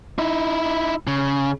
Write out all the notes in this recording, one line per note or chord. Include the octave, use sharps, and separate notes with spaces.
D#4 E4
C#3